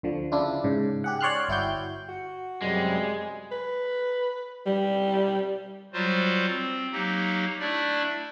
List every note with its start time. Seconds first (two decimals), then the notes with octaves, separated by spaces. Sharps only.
0.03 D2 D3 F3
0.32 C#3 D4 E4 F4
0.64 G#2 C#3
1.04 G4 G#4 F#5
1.21 C#5 D5 C6 F6 F#6
1.48 G1 E4 F#4 G5 G6
2.09 F#4
2.62 F#2 C3 G3 G#3
3.52 B4
4.66 G3
5.93 F#3 G3 F4 F#4 C5
6.46 C4
6.92 F#3 A#3 D#4 G4
7.59 A3 D4 E4 D5